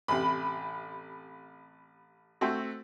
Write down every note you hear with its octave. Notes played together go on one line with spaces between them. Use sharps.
A1 C3 B5
A3 C4 F#4